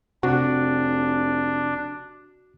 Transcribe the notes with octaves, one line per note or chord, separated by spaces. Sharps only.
F1 C3 D4 F#4